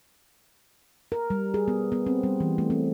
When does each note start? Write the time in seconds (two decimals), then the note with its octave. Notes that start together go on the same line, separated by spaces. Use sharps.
1.12 A#4
1.30 G3
1.54 G#4
1.68 B3
1.92 B3
2.07 C4
2.23 G3
2.40 E3
2.58 A3
2.70 C4